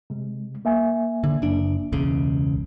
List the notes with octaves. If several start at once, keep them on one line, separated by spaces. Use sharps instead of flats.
C3 G#3
A#3 E5 G#5
D3
F#1 D4
E1 C#2 C#3